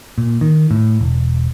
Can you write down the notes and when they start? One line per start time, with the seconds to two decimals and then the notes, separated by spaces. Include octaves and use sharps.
0.18 A#2
0.41 D#3
0.71 A2
1.01 E1